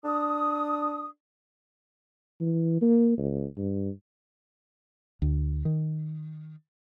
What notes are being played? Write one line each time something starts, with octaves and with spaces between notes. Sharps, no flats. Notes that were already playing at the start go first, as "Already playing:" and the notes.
D4 D#6
E3
A#3
C#2
G2
D2
D#3